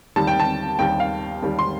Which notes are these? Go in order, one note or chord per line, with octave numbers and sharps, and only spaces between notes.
D#2 D#3 G3 A5
G5
A5
D#2 D#3 G3 G5
F5
D#2 D#3 G3
C6